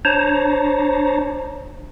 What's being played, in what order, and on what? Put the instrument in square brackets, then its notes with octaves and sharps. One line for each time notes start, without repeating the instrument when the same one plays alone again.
[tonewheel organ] D4 C5 C#5 A5 A#5